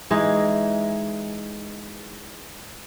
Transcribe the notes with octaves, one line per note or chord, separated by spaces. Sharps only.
E3 G#3 D#4